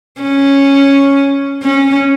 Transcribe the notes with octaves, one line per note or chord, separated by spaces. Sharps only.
C#4
C#4